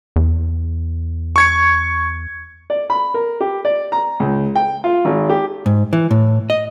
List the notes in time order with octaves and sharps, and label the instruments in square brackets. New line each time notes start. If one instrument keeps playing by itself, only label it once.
[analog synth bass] E2
[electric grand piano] C#6 G#6 C#7
[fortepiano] D5
B5
A#4
G4
D5
A#5
C#2
G5
F4
G#1
G4
[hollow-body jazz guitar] G#2
E3
A2
D#5